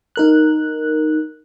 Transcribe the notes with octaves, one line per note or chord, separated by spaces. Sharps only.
D#4 A#4 F#6